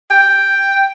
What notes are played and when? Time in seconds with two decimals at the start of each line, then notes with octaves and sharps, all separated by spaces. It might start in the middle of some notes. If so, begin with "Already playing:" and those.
0.11 G5